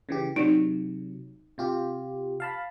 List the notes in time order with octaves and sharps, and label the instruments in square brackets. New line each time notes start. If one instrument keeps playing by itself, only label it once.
[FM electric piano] C#3 E3 G4
[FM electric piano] C3 F#3 [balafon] D#4
[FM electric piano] C3 F4 G4
F5 A5 B5